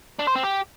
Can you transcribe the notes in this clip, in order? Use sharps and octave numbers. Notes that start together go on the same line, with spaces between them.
D4
C5
C4
G4